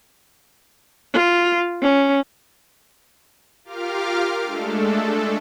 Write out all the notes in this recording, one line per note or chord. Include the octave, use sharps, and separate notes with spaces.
F4
C#4
F4 G4 A#4 F5 D6 F6
G#3 A3 D4 A4